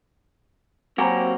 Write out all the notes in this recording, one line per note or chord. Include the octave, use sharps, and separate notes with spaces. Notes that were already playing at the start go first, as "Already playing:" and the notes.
F#3 A#3 C4 F#4 G4 G#5 A#5 B5